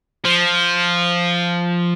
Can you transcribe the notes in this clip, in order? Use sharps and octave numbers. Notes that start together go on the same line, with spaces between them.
F3